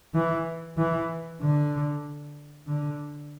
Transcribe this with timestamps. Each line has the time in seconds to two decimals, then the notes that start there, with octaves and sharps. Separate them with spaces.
0.14 E3
0.78 E3
1.41 D3
2.67 D3